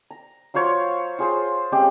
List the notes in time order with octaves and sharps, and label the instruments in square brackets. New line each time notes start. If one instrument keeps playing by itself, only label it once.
[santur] A#5
F#3 F4 C5 C#5
F4 G#4 C5
G#3 C4 C#4 G4